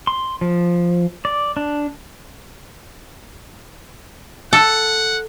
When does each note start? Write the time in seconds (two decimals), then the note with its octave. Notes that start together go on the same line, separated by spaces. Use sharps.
0.07 C6
0.41 F3
1.25 D5
1.57 D4
4.53 A4 F#5